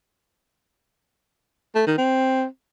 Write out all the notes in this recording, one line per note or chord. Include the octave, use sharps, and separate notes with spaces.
A3
D#3
C4